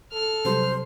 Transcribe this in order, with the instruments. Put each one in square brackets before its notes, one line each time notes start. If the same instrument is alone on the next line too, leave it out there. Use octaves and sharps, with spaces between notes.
[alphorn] A4 [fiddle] F6
[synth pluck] C3 F#3 G3 [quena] C5